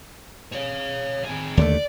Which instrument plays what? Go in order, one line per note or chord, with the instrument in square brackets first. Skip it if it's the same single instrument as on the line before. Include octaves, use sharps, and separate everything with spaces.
[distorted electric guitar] C#5 F5
C4 G#4
[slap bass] D#2 D3 A3 [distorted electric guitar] D5